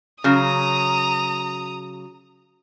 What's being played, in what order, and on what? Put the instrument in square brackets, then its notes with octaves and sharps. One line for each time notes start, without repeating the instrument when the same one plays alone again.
[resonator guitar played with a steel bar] C#3 F#3 [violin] A#5 D#6